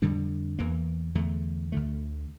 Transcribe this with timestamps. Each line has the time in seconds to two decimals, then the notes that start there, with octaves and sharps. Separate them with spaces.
0.02 F2 D3 G3 D4
0.59 E2 E3 A#3
1.15 E2 D3 A3
1.72 D2 D3 A3